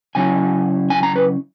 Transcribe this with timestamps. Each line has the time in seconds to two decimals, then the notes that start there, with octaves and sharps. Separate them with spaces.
0.15 C#3 F#3 C#4 E4 G#5
0.90 G#5
1.03 A#5
1.16 B4